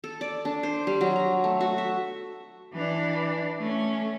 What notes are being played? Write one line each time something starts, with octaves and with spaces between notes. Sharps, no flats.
A4
D5
D4
C5
G3
F#3
A#5
A3
F#4
E5
E3 D4
A3 C#4